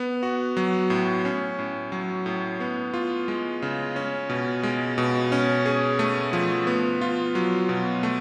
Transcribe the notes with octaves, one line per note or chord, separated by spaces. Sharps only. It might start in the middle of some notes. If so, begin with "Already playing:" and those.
Already playing: B3
F#4
F#3
A2
C#4
A2
F#3
A2
B3
F4
G#3
C#3
C#4
B2
G#3
B2
C#4
G#4
A3
F3
B3
F4
F#3
B2
A3